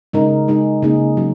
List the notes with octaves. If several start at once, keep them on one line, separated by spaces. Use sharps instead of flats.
C#3 G#3 D#4 A#4
G#3 D#4 G#4
C#3 A#3 D#4 G#4
F#3 C#4